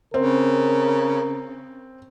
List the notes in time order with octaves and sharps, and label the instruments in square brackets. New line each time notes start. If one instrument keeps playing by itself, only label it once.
[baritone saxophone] C#3 [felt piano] C4 [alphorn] A#4